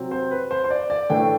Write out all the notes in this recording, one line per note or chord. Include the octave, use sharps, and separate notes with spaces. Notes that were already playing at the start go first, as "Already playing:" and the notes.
Already playing: C3 F#3 C4
C5
B4
C5
C5
D5
D5
A2 E3 A3 D4 G5